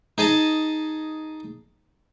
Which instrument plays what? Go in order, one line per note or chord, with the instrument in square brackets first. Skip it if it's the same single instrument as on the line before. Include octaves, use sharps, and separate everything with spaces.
[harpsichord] D#4 G#4 D#5 A5